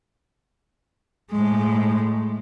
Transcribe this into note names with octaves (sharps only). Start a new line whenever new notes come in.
A2 G#3